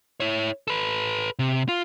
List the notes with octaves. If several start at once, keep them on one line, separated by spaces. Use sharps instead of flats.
E4 C#5
A4 B4
C3
F4